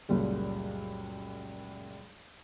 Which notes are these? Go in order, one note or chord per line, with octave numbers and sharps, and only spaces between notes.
C#2 F#2 A#2 G3 G#3